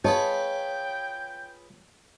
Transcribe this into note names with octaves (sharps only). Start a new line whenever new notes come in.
F4 G#4 B4 C#5 D#5 G5 A5